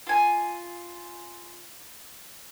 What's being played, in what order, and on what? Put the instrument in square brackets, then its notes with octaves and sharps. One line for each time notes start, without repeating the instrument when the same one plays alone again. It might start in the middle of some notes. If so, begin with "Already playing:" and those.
[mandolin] F4 G#5